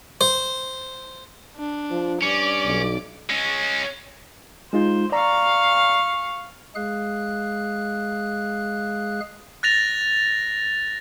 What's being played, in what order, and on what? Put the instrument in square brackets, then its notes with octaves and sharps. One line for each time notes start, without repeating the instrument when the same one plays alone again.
[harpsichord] C5
[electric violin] D4
[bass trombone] F3
[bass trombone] G2 [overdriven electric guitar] C#4 [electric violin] D5 D6
[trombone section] B1
[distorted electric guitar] G#3 C#4
[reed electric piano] G#3 D#4 F4 [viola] C5
[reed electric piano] D5 A#5 [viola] F5 C#6
[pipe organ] G#3 G#4 F5 F#6
[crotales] F#6 A6 A#6 F7